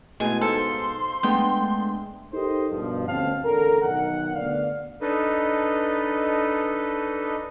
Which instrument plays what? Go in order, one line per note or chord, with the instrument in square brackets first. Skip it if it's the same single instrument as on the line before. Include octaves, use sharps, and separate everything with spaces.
[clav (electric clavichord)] B2 G#3 [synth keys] A3 E4 D#7 [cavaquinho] G#5
[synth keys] D#4 C5 F5 [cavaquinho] A4 [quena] C6
[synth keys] G#3 A3 D4 [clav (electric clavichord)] B3 [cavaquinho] G5
[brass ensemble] D#4 G4 A4 A#4 C5 D#5
G2 B2 F3
D2 B2 C4 C#4 F5 A5
A1 D3 A4 A#4
B1 D#3 F#5
D2 B3 D5 F5
[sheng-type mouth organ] D4 D#4 A4 B4 D#5